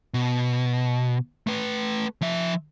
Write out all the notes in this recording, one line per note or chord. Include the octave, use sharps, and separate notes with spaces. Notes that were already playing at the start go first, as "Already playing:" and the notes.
B2
A3 B4
F3 E5